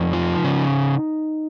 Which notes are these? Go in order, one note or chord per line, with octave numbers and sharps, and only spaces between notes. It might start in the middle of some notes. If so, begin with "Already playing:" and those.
Already playing: F2 D#4
F3
C#3